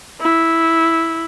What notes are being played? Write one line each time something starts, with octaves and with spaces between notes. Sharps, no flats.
E4